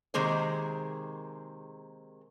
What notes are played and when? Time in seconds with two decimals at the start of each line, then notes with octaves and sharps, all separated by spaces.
0.14 C3 D#3 G#3 A#3 G#4 C5